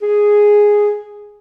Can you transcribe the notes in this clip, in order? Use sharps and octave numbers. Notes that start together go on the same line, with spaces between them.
G#4